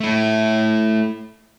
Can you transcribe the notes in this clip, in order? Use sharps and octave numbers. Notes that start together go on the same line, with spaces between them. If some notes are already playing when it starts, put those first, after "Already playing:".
A3 E4